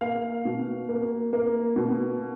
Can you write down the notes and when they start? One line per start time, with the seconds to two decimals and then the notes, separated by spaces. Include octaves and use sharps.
0.01 A#3 F5
0.45 B2
0.89 A#3
1.33 A#3
1.76 B2